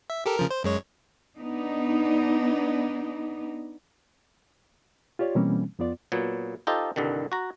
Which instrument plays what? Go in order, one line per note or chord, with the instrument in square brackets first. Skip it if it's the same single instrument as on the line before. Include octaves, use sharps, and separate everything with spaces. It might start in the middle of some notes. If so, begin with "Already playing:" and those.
[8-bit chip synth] E5
G4 A4 A#4
C#3 F3 A#4
C5
F#2 G#3 C#5
[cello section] B3 D4 D#4
[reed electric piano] F4 G4 C#5 D5
B2 E3 G3 A#3 C4 C#4
F2 B3 F4 D5
[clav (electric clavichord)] A#2 F#3 B3
D#4 F4 G4 A4 C5 D#5
C2 G2 D3 D#3
F#4 A#5